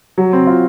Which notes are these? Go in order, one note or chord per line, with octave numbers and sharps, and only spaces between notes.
F#3
C4
F4